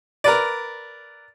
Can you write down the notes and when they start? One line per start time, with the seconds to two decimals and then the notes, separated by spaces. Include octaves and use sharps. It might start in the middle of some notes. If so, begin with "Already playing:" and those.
0.24 A#4 B4 D5